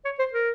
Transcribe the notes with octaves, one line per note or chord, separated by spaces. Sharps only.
C#5
C5
A#4